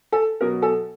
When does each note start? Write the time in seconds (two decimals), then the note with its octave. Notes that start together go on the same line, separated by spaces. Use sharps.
0.12 A4
0.41 B2 F#3 A#4
0.62 A4